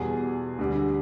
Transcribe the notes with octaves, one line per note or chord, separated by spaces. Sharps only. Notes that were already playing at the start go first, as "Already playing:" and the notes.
Already playing: E2 B2 G3 G#4
D2 D3 G3